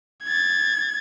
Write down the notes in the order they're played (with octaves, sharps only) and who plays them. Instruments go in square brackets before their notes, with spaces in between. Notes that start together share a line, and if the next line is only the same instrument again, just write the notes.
[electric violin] G#6 A6